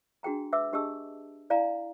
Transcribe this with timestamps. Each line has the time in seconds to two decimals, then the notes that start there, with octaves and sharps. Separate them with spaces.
0.23 D4 F#4 G#4 G5 A#5
0.52 B4 E5 D6 E6
0.73 D4 G4 G#4 D#5 A5 E6
1.50 E4 D5 F5 G#5 A#5